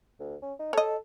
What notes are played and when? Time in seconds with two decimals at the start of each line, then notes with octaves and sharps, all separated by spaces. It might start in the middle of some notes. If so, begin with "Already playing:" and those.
0.20 D2
0.42 C#4
0.59 D#4
0.73 A4 C#5 D#5